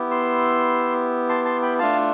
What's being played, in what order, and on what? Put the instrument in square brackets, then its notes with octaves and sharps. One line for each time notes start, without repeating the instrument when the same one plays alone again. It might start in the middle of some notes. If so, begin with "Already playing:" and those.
Already playing: [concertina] B3 E4 G4
C6 E6
A5 C6
A5 C6
G5 B5
A3 D4 F4 F5 A5